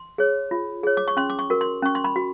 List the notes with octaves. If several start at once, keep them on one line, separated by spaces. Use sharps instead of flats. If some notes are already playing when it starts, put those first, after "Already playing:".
Already playing: C6
G#4 C#5
F4
G#4 C#5
D6
C#6
C#4 C6
D6
C#6
F#4 A#4
C6
C#4 C#6
C6
B5
F#4